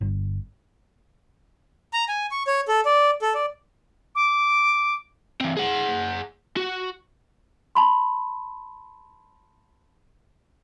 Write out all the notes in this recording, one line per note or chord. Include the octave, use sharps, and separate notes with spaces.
G1
A#5
G#5
C#6
C#5
A4
D5
A4
D5
D6
E3 C4
G#4 F#5
F#4
A5 B5 C6